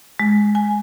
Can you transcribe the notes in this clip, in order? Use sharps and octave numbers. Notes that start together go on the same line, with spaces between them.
G#3
G#5